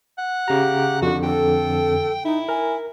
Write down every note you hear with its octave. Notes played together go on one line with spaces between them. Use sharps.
F#5
C#3 G4 A#5
F2 D3 F#4
A4 G5
D#4 E4
A#4 G#5